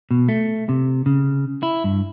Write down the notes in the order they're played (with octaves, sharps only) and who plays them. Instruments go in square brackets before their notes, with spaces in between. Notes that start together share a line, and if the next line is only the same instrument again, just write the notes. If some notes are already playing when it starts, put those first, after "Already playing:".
[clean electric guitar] B2
A3
C3
C#3
E4
G2